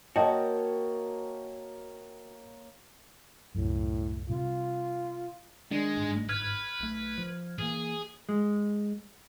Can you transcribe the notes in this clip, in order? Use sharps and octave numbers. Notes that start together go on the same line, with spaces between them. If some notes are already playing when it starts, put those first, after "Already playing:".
A#3 F#4 C#5 D#5 G5 A5
C2 F#2 A2
C3 G3 F4
D#3 G#3 D4
G1 G#2
B4 F6 G#6
B1 A3
F3
E3 A#3 G#4
G#3